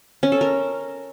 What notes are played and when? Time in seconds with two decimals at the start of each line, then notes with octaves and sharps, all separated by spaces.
0.23 C#4
0.32 A4
0.41 A#4